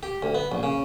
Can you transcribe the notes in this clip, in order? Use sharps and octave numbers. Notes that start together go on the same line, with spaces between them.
G4
D2
B3
A#1
C#3